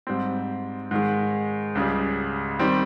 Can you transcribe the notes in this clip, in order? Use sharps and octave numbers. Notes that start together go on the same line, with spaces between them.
G#2 G3 C4
G#2 D#3 G#3
C#2 C#3 G3
D#3 G3 C4